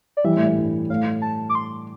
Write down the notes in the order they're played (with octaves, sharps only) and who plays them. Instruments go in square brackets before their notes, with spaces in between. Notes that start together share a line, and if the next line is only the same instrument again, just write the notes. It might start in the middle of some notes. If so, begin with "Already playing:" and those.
[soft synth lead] D5
[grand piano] E3 G3 [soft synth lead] E5
[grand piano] A2
A2
G2
[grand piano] A2 [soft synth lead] F5
[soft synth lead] A5
D6
C6